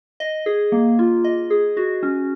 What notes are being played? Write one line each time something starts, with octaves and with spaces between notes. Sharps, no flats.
D#5
G#4
A#3
F4
D#5
G#4
F#4
C#4